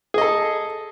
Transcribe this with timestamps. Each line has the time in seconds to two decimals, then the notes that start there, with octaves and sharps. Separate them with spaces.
0.14 G#4
0.18 D#5
0.21 A4